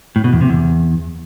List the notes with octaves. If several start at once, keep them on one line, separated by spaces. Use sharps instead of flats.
A2
B2
E2
C3
E2